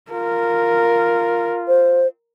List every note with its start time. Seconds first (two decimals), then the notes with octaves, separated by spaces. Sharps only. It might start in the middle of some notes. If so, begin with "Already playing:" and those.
0.11 F4 A#4
1.68 C5